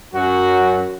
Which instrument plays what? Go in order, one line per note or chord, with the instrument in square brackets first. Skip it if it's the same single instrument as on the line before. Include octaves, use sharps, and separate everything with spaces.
[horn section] F#2 F#3 F#4